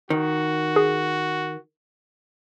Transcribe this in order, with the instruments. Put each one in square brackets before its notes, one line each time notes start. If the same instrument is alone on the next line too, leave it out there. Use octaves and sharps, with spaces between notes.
[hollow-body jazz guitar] D#3 [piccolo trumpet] F#4
[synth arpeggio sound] G#4